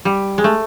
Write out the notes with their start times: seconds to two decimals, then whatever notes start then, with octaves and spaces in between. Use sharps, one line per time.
0.05 G3
0.38 G#3
0.44 A3